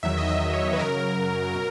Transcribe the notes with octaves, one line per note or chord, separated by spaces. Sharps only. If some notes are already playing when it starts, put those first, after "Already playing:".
E2 D#3 F#3 E5
D#5
E5
C#5
B4
F#2 C#3 F#3 A#4
B2 F#3